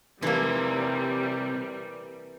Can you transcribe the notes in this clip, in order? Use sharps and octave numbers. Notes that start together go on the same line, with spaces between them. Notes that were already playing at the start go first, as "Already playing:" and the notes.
C3 E3 G3 A#3 A4